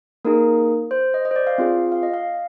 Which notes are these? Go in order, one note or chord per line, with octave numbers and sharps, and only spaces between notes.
A#3 D#4 G#4 A#4
C5
D#5
D#5
C5
D5
F5
C4 F4 G#4
F5
D#5
F5